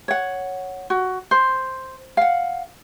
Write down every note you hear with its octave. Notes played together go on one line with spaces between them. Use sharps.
C#5 F#5
F#4
C5
F5 F#5